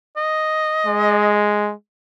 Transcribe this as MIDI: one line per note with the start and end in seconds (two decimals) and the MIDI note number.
0.17 1.41 75
0.86 1.73 56